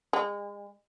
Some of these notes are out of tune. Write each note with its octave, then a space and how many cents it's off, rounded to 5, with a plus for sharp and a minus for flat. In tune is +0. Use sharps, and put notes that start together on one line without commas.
G#3 -35